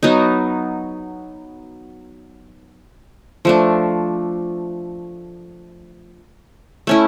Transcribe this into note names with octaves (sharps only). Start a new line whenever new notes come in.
F#3 B3 D#4
F3 A3 D4
A3 C#4 E4